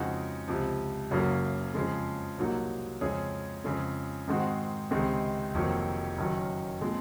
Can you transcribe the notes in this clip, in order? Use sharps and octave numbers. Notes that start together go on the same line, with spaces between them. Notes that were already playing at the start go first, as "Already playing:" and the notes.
Already playing: F2 C#3 G#3 D#4 F#4
C#2 C3 F3
F#1 F#2 C#3 F#3 A#3
F2 C#3 F3 G#3
C2 A#2 F#3 A#3 D#4
F2 C#3 G#3 C#4 G#4
F2 C#3 G#3
G#2 D#3 G#3 C4 F#4
C#2 C3 D#3 G#3 C4
F1 F2 D#3 F#3 A#3
F#1 F#2 D#3 F#3
A#2 F3 G#3 C4